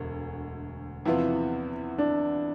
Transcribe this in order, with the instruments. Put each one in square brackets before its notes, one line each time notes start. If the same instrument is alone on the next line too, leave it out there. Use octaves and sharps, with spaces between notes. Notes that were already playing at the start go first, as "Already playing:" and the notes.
Already playing: [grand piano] E1 D2
[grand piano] E2 C3 F3 B3 F4 [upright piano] E4
[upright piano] D4